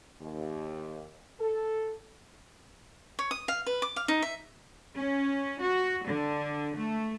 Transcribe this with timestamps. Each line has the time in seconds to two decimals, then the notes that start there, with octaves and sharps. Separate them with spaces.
0.22 D#2
1.40 A4
3.19 C#5
3.31 D#6
3.48 F5
3.66 B4
3.82 D6
3.96 F5
4.08 D#4
4.22 E5
4.93 C#4
5.59 F#4
6.04 D3
6.74 A3